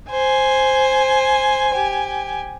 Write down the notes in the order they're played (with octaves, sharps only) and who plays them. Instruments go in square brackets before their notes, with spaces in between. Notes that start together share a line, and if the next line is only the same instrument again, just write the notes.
[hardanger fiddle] C5 [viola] G#5
[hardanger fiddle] G4